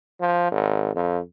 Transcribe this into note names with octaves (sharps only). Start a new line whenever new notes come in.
F3
G#1
F2